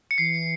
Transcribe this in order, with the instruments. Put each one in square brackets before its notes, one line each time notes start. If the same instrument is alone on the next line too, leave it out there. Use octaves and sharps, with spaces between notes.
[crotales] C#7
[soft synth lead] E3 [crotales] C7